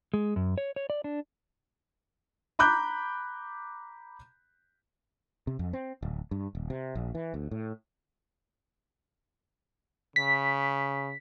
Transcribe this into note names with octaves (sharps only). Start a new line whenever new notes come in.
G#3
F#2
C#5
C#5
D5
D4
A#5 B5 D6 F#6 G6
C3
F2
C4
D1
G2
D#1
C3
A#1
E3
D2
A2
C#3 B6